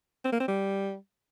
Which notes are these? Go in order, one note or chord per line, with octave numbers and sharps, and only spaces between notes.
C4
A#3
C4
G3